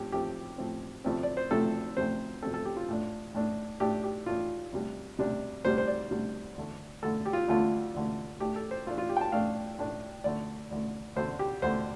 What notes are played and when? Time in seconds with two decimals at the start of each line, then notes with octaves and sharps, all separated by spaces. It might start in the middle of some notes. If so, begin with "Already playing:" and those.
Already playing: A2 F3 A3 C4 G4
0.12 A2 F3 A3 C4 G4
0.58 A2 F3 A3 C4
1.04 D2 C3 F3 A3 C4
1.23 D5
1.37 C5
1.51 D2 C3 F3 A3 C4 A4
1.97 D2 C3 F3 A3 C4 C5
2.42 D2 C3 F3 A3 C4 A4
2.54 A4
2.65 G4
2.77 F4
2.89 A2 A3 D4
3.34 A2 A3 D4
3.80 A2 A3 D4 G4
4.04 G4
4.26 A2 A3 D4 F4
4.72 D2 C3 G3 D4
5.19 D2 C3 G3 D4
5.65 D2 C3 G3 D4 C5
5.78 C5
5.87 D5
6.11 D2 C3 G3 D4
6.57 D2 D3 A3
7.02 D2 D3 A3 A4
7.26 G4
7.33 F4
7.48 D2 D3 A3 F4
7.94 D2 D3 A3
8.40 A2 A3 D4 G4
8.56 A4
8.71 C5
8.86 A2 A3 D4 F4
8.98 F4
9.09 G4
9.17 G5
9.21 A5
9.32 A2 A3 D4 F5
9.78 A2 A3 D4
10.24 D2 D3 A3 D5
10.71 D2 D3 A3
11.16 D2 D3 A3 C5
11.39 G4
11.62 D2 D3 A3 C5